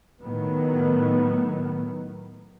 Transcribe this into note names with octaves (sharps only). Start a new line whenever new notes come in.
A2 D#3 F#3 B3